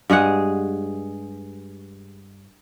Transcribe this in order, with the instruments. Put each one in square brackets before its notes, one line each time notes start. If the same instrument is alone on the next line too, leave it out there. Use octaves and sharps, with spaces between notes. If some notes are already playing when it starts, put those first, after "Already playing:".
[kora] G2 G#3 G#4 F#5